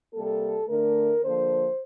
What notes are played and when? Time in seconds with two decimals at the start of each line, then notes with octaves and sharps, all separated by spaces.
0.14 C3 G3 A#3 A4
0.68 D3 A3 A#4
1.23 D3 F3 A#3 C5